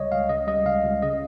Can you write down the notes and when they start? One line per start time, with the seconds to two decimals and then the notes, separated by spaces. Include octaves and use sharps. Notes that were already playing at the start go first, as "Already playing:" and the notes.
Already playing: C#2 C#3 G3 C#5 D#5
0.12 C#2 F5
0.29 C#3 D#5
0.47 G3 D#5
0.65 C#2 F5
0.85 C#2
1.02 C#3 D#5